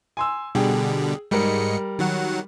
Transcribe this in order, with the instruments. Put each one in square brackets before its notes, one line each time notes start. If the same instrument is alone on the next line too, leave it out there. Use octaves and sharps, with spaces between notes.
[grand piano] G#5 C6 E6
[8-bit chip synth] B2 D3 G3 [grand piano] G#4 G5
[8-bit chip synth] G#2 G#3 C#7 [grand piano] G3 A#4
[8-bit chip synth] D#3 F#3 F#5